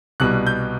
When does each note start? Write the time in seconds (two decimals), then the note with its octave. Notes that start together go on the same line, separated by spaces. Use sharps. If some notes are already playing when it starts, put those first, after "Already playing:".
0.20 C2 B2 G3 F#6
0.47 G6